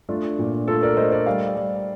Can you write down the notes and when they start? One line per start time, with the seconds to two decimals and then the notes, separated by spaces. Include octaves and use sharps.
0.09 A3 D4 F4
0.39 A#2
0.67 A3 F4 A4
0.83 A#4 D5
0.97 A3 C5 D#5
1.12 A#4 D5
1.26 G3 D5 F5
1.56 G3